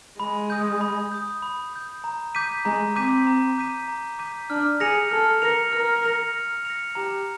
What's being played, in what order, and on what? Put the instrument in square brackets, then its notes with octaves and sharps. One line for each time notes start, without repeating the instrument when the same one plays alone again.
[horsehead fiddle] G#3 [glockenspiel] B5
[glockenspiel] D#6 G6
B5
D#6 G6
B5
D#6 G6
A#5
D6 G6 B6 D#7
[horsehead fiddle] G#3 [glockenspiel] A#5
[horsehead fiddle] C4 [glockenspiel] D6 G6 B6 D#7
[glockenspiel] A#5
D6 G6 B6 D#7
A#5
D6 G6 B6 D#7
[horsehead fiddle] D4 [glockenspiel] F6
[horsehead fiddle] G#4 [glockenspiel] A#6 C#7 F7
[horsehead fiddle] A4 [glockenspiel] F6
[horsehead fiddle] A#4 [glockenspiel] A#6 C#7 F7
[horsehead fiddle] A#4 [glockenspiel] F6
[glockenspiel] A#6 C#7 F7
F6
A#6 C#7 F7
[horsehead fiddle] G4 [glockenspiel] A#5